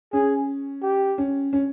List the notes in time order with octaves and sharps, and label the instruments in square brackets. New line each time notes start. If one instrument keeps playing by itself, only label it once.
[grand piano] C#4 [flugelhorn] G#4
[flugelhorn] G4
[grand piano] C#4
C#4